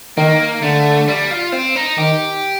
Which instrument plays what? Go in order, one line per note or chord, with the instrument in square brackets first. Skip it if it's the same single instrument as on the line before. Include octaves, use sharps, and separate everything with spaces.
[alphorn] D#3 [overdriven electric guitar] A#3
[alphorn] D3 [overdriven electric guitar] A3
[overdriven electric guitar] G3
F4
C4
D#4
[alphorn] D#3 [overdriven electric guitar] G4